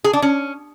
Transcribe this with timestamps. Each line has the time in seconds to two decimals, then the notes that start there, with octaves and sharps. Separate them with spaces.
0.04 G#4
0.13 D4
0.22 C#4